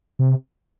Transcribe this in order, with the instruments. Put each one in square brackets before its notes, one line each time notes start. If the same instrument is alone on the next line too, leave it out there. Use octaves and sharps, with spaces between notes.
[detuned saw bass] C3